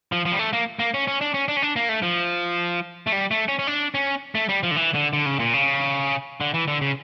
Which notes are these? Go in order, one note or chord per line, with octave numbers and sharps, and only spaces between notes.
F3
F3
G3
A3
A#3
A#3
C#4
C#4
D4
C#4
D4
C#4
D4
A#3
A3
F3
A3
G3
A3
C#4
C#4
D4
C#4
A3
G3
F3
D3
E3
D3
D3
C#3
A#2
C#3
D3
E3
D3
C#3